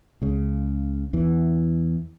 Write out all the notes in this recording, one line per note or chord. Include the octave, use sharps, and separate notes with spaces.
C#2 C#3
E2 E3